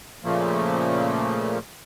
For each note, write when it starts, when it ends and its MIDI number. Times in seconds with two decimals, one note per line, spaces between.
0.25 1.58 46
0.25 1.58 49
0.25 1.58 53
0.25 1.58 57
0.25 1.58 58